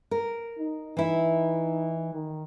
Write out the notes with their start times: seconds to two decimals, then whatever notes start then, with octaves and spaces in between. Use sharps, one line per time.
0.11 A#4
0.59 D#4
0.97 E3 E4
2.13 D#3